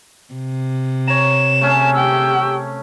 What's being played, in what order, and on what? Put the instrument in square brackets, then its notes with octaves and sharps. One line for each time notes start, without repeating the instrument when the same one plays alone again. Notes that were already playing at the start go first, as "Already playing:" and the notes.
[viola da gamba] C3
[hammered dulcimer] C#5 A#5 [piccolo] E7
[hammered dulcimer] A3 C#4 G#4
[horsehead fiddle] G4 G5 [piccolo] E6